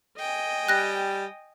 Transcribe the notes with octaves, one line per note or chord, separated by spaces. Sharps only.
D#5 G5 G#5
G3 F#6 A#6